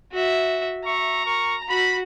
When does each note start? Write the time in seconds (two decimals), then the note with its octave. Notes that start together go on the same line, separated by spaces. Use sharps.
0.12 F#4 E5
0.85 E5 A#5 C#6
1.25 A#4 C#6
1.68 F#4 B5